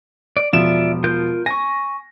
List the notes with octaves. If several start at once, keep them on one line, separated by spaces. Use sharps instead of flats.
D5
E1 F3 F4 D5 E5 E7
F4 A#4 G6
G#5 C#6 A#6